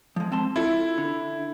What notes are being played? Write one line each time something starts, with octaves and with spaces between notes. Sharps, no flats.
F3 G#3
C4 A5 C6
E4 F4 A4
D3